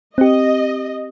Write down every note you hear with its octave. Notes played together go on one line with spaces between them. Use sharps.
C4 G4 D#5